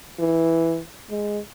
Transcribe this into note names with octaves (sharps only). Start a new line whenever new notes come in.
E3
G#3